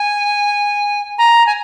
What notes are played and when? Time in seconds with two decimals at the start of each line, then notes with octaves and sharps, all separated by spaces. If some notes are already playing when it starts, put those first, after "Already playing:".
Already playing: G#5
1.18 A#5
1.47 G#5